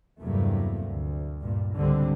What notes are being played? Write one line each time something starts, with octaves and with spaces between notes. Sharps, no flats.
E2 G2 C3 F#3 A3 A#3
D2
G2 A#2
C#2 G#2 D3 G3 C4